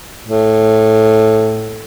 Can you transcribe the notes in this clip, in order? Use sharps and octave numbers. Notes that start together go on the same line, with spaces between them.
A2